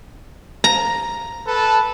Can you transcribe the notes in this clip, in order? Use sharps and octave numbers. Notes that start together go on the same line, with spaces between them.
A#5
A4 B4 A5